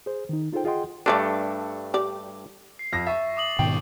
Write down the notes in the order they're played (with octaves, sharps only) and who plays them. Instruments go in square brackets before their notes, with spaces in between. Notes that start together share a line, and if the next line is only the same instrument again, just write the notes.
[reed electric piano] G#4 C5
D#3 D#4
D#4 F4 G#4 A4 C5 G5
F4 G#4 D#5 F#5 G5 C6
[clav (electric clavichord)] G2 A3 D4 [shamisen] B4 C5 D5
[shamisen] G4 D5
[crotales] C7
[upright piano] F2 A#6
[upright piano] E5 [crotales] C#6 A6
[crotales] D6 D#6 F#7
[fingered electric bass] G#2 B2 D#3 [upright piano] G5